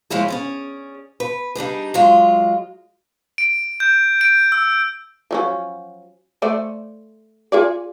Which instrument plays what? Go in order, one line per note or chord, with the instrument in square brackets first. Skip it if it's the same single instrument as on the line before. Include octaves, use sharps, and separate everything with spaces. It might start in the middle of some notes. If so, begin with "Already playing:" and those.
[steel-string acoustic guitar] F3 G#3 C#4 E4 G#4
C#4 G#4 D5
B4
G3 D4 D#4 G#4
F#3 G#3 F4
[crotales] D7
G6
D7
E6
[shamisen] F3 F#3 C#4
A3 C5 D5
F4 G#4 D5